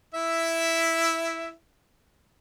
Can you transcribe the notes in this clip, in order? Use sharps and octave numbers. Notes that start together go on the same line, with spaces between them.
E4 E5